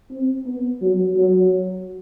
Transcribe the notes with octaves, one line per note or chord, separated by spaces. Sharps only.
C4
B3
F#3
F#3